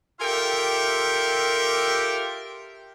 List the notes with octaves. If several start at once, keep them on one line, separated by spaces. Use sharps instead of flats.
F4 G4 A4 A#4 E5 G5